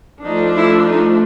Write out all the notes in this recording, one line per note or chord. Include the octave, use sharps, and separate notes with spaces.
F3 A3 D4 D#4
E4
D#4